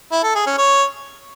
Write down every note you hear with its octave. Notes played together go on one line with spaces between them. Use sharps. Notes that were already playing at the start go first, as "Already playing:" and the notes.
E4
A4
G#4
C#4
C#5